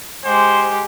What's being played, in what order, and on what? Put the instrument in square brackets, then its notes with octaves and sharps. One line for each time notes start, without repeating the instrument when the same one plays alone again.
[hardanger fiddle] G#3 G4 [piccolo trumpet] C5